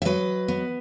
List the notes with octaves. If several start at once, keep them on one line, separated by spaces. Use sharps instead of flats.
E5
F#3 B4 D#5
B3